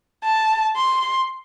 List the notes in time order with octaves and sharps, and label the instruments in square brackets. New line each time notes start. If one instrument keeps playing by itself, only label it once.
[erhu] A5
C6